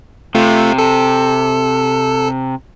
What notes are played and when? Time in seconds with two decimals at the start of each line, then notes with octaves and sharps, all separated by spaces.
0.35 C3 A3 F4
0.78 A4